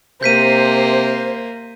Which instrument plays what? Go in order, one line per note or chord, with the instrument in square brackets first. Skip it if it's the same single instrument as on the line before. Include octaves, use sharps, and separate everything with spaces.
[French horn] C3 [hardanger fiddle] A#3 [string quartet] C5 [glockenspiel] G6 B6 D#7